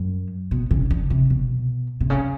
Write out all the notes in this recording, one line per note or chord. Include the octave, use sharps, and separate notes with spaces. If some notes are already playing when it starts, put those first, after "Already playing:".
Already playing: F#2
B2
C#3
D3
C3
B2
C3
C#3